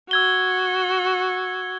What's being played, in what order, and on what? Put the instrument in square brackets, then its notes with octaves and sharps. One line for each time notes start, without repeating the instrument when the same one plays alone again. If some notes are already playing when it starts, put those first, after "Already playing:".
[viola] F#4 [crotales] E6 G#6 G7